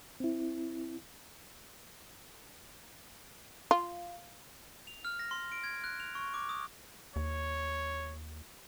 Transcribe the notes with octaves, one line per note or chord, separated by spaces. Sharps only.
C4 E4
F4
F7
F6
A#6
C6
D7
G#6
F#6
F7
C#6
D6
D#6
D#2 C#5